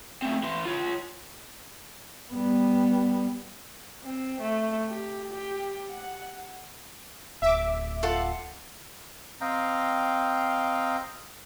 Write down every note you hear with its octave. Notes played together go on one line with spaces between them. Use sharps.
A3 C4
E3 C6
F4 C#5
G3 B3
C4
A3
G4
G4
F#5
D1 E5 D6
F4 A4 F#5
C4 D#5 F5 G5 A#5